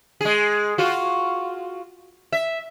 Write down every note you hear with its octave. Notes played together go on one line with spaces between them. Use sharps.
G#3 G#4
F4 F#4
E5